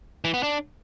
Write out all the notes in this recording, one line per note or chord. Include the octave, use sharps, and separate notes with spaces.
E3
B3
D4